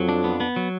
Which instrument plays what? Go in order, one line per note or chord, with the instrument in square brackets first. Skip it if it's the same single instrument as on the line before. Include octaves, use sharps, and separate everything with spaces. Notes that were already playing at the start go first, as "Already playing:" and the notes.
Already playing: [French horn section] F2 [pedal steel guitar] F#3
[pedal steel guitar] D4
B3
B3
F#3